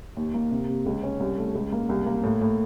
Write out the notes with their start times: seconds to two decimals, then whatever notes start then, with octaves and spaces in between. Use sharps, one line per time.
0.17 D#2
0.34 A#3
0.51 C3
0.68 C3
0.86 C#2
1.03 C#4
1.20 C2
1.38 A3
1.55 C#2
1.72 A#3
1.89 C2
2.06 A#3
2.24 A2
2.41 A2